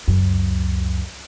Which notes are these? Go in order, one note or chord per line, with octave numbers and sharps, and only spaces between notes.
C#2 F#2